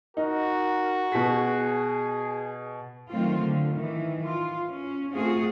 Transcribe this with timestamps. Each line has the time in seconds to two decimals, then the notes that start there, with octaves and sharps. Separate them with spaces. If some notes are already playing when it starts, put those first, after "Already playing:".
0.17 D#4 F#4 A#4
1.12 B2 G#4 B6
3.10 D#3 F#3 A3 C4 F4
3.41 D3
3.75 D#3 E3
4.23 F4
4.69 C#4
5.14 A3 C4 F4 F#4 G#4